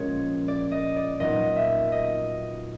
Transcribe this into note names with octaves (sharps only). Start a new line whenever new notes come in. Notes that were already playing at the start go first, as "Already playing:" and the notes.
Already playing: A#2 F3 G#3 C#4 C#5
D5
D#5
D5
A#2 F#3 B3 D#4 D#5
E5
D#5